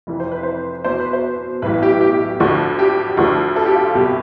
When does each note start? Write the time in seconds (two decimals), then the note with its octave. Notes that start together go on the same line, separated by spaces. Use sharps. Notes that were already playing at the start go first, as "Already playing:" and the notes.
0.07 F1 F2 E3
0.20 C5
0.31 B4
0.43 C5
0.84 E2 B2 C5
1.00 B4
1.13 C5
1.62 B1 A2 E3 B4
1.83 G4
2.01 G4
2.40 D2 D3 F3
2.79 G4
3.17 D2 D3 F3
3.56 A4
3.66 G4
3.75 F4
3.95 C2 B2 G4